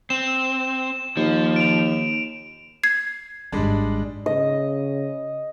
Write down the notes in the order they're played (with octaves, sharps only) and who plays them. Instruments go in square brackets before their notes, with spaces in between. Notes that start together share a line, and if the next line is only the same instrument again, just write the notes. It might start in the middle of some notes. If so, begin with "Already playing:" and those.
[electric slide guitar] C4 [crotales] E7
[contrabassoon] D#2 [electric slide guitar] F3
[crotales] D7 F7
[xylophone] G#6 C7
[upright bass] G#1 G#2 [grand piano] G3 G#3 D4
[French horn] C#3 [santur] D#5